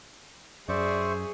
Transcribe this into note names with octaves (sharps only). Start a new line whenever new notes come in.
F#2 G#4 C5 D5 E5 C#6